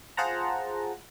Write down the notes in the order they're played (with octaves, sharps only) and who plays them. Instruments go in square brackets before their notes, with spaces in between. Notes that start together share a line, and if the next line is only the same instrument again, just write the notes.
[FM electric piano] F4 G#4 C5 F#5 A5 A#5